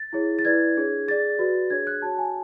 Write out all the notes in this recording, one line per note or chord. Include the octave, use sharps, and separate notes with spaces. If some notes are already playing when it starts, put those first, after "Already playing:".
Already playing: A6
E4 G#4 C#5
A6
E4 B4 D5 G#6
D4 G#4 C#5
G#4 D5 A6
F#4 B4 D5
D4 G#4 C#5 G#6
F#6
F#4 C#5 A5
G#5